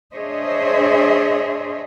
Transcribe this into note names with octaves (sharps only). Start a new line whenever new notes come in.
D4 G#4 C5 C#5 D#5 E5